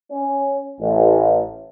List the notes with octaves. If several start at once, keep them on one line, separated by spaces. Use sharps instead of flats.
C#4
A1